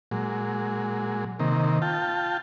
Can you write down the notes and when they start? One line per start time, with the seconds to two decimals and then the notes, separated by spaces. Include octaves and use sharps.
0.11 A#2 F#3 G#3
1.39 C3 D#3 A#3
1.82 F4 G5 A5